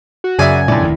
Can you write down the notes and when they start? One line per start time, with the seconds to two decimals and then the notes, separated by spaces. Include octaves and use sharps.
0.24 F#4
0.39 F#2 C#3 G#4 D5 E5 G#5
0.68 F2 A#2 A3 D4 E4 D5
0.80 D#1 D2 D#3